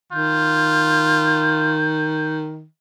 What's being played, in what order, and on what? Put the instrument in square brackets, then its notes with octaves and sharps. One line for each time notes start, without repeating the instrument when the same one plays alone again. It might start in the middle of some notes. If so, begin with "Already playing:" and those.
[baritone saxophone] D#3 [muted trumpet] F4 [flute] G6